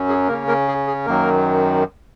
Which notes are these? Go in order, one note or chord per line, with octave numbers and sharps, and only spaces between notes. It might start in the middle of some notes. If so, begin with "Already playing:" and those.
Already playing: F#2 F#3 C#4
G#4
C#3 A#3 C#4 A#4
A#3 A#4
G#4
G#4
F#2 D#3 F#3 A#3 A#4